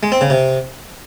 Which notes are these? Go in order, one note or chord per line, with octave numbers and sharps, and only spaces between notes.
G#3
C4
C#3
C3